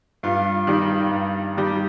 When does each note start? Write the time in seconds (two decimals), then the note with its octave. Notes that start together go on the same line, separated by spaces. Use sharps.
0.23 G2 F4
0.67 D#3 G3
1.11 G2
1.56 D#3 G3